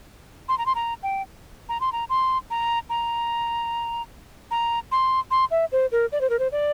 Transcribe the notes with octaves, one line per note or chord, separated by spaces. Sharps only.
C6
A#5
C6
A#5
G5
A#5
C6
A#5
C6
A#5
A#5
A#5
C6
C6
E5
C5
A#4
D5
C5
A#4
C5
D5